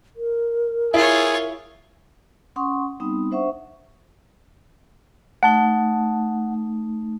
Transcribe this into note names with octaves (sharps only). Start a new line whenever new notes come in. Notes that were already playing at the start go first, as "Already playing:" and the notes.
A#4
E4 F4 G#4 C#5
C#4 F#5 C6 C#6 D#6
G3 B3 C4 D#4 D#6
D4 C5 E5 F#5 C#6
A3 D#4 F#5 A5